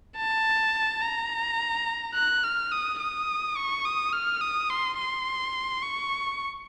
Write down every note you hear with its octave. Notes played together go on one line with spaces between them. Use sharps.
A5
A#5
F#6
F6
D#6
D#6
C#6
D#6
F6
D#6
C6
C6
C#6